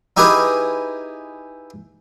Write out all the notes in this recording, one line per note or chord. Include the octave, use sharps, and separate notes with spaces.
D#4 E4 G4 G#4 B4 D#5